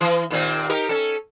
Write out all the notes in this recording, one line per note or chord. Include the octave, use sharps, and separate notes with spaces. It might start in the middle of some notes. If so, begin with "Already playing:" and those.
E3
D#2 A#2 C4
D#4 G4 A#4
C#4 A4